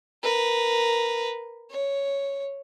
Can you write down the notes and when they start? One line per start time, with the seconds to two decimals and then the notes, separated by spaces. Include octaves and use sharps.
0.23 A#4 B4
1.70 C#5